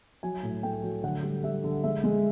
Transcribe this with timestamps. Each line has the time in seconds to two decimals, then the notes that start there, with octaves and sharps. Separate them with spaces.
0.23 F#3 G#5
0.43 A2
0.63 A3 G5
0.83 F#3
1.03 D3 F#5
1.23 G3
1.44 G3 E5
1.64 D3
1.84 G#3 E5
2.04 G#3